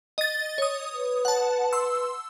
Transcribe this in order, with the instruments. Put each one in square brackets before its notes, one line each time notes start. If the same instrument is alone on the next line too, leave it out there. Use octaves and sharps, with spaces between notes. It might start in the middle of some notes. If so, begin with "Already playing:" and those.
[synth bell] D#5 A6
C#5 D#6
[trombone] B4
[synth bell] F#5 A5
C6 E6